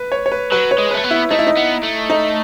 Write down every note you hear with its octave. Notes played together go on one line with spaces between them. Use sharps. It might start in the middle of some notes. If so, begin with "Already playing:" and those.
Already playing: B4
C#5
C#5
B4
F#3 B4
C#5
G#3
A3 B4
B3
E4
A3 D#4
E4
D#4
B3
A3
D#4